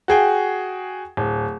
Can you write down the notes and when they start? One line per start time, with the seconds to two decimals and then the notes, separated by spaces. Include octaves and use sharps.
0.08 F#4 G#4 G5
1.17 D1